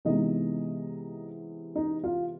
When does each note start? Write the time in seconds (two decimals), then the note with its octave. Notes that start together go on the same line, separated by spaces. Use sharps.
0.05 C3 E3 G#3 B3 D#4 D#5
1.76 D#4 D#5
2.04 F4 F5